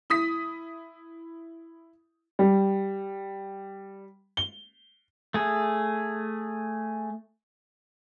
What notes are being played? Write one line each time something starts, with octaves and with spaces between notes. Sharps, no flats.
E4 D#6 B6
G3
G7
A3 G#4